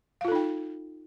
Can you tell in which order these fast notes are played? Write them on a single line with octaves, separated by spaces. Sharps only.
F5 F4 A4 D#4 G5